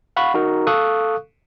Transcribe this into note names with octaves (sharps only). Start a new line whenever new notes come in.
F5 F#5 B5 C#6
D#4 F#4 A#4
A4 F5 C#6 D#6 F#6